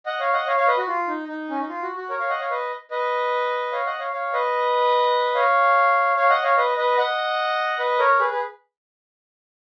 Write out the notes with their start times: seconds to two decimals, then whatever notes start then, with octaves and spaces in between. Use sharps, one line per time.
0.06 D#5 F#5
0.20 C#5 F5
0.33 D#5 F#5
0.47 C#5 F5
0.57 C#5 F5
0.67 B4 D#5
0.77 F#4
0.88 F4
1.08 D#4
1.28 D#4
1.50 C#4
1.60 D#4
1.69 F4
1.82 F#4
1.96 F#4
2.10 A#4 C#5
2.20 C#5 F5
2.30 D#5 F#5
2.40 C#5 F5
2.50 B4 D#5
2.91 B4 D#5
3.72 C#5 F5
3.86 D#5 F#5
3.99 C#5 F5
4.13 C#5 F5
4.33 B4 D#5
5.35 C#5 F5
6.16 C#5 F5
6.30 D#5 F#5
6.43 C#5 F5
6.57 B4 D#5
6.77 B4 D#5
6.98 D#5 F#5
7.79 B4 D#5
7.99 A#4 C#5
8.20 G#4 B4
8.30 G#4 B4